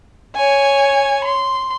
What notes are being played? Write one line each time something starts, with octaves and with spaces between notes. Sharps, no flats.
C#5 G#5
C6